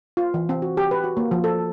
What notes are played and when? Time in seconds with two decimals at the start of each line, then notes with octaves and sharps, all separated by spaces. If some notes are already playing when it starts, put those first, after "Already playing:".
0.17 F4
0.34 E3
0.49 C4
0.62 F#4
0.77 G4
0.91 B4
1.04 F#4
1.17 A#3
1.31 F3
1.44 A4